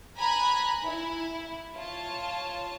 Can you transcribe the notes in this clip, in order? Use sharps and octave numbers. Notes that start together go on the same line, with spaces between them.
G#5 A#5 B5 F#6
E4
F4 C#5 A5